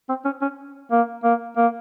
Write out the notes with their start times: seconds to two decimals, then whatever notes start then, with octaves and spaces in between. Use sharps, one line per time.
0.09 C4
0.25 C#4
0.42 C#4
0.91 A#3
1.23 A#3
1.57 A#3